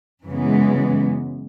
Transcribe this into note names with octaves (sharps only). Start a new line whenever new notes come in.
F#2 C#3 E3 G#3 B3